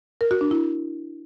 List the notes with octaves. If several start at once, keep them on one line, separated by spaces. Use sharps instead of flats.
A#4
F#4
D4
E4